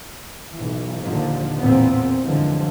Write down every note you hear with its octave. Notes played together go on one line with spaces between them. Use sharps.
B1 E3
D#2 A#2 D3 F3
A1 E2 A#2 B3 C4
F#2 D3 E3 F3 G#3